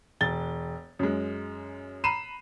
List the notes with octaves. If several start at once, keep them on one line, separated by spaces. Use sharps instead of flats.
E1 A6 G7
F#2 G#3
A#5 B5 C7 D#7 E7